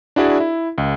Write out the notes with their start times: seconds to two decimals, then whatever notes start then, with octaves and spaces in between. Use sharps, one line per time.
0.16 D4 E4 F#4 G#4 D5 E5
0.40 E4
0.78 C#2